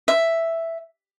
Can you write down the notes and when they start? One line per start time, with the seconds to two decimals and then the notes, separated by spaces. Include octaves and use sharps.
0.08 E5